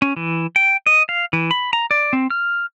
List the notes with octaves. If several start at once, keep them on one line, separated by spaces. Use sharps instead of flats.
C#4
E3
G5
D#5
F5
E3
B5
A#5
D5
C4
F6